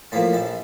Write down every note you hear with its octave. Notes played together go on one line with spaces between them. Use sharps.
A2 F3 A#3 A5 B5
A#1 A5 B5